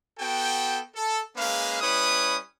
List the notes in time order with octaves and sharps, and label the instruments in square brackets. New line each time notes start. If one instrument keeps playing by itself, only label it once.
[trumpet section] B3 F#4 A4 G5
A4
G#3 A#3 C#4 B4 F5
G3 C#4 E4 B4 C#5 D#6